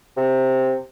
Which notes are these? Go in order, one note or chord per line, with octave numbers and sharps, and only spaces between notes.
C3